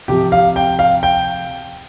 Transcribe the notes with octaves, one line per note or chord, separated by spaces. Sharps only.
C3 F3 G4
F5
G5
F5
G5